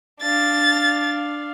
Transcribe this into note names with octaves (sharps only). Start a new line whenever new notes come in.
D4 F5 A6